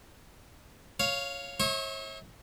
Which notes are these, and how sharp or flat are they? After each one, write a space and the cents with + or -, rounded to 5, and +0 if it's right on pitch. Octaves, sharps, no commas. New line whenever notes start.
C#5 +0 F5 +0
C#5 -40 E5 -35 C#6 +0